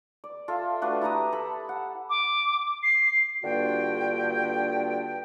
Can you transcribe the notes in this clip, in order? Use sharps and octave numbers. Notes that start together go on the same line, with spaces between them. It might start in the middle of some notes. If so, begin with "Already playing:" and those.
D5
F4 A4 E5 F5
A3 D4 F#4 B4
E4 G4 A#5 D#6
A4 B5
F#5
D6
C7
G2 D3 A#3 F4 F#4 G5